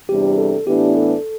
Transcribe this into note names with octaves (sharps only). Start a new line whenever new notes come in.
E2 C3 G3 D4 G4
A4
A2 E3 B3 D4 G4
A4